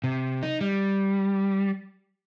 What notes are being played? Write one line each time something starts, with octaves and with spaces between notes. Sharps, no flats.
C3
D#4
G3